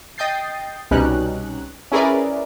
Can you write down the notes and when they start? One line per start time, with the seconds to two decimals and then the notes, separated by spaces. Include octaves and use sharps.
0.18 D#5 G5 D#6 G6 A6 C7
0.91 C2 B2 G3 C#4 D#4 F#6
1.92 C#4 E4 G#4 A#4 B4 D5